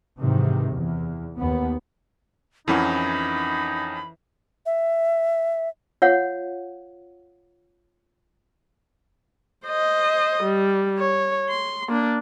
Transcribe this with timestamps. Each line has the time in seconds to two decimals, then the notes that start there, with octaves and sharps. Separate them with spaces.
0.20 G#2 C3 D#3 E3
0.71 E2
1.37 D#2 B3
2.68 F2 E3 C#4 D#4 A#4 F#5 B5
4.66 E5
6.02 F4 C#5 F5 F#5
9.66 C5 D#5
10.44 G3
10.98 C#5
11.49 C6
11.88 A#3 D4